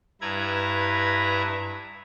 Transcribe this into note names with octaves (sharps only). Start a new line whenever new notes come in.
G2 E4 B4 A#5 G#6